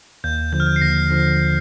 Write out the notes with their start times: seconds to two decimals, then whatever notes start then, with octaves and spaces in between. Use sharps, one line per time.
0.24 D#2 G6
0.52 D3 F3 G6
0.60 F6
0.67 G6
0.76 C7
0.82 D#2 A#6
1.10 D3 F3